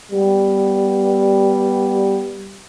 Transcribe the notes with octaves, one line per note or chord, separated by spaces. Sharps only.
G3 B3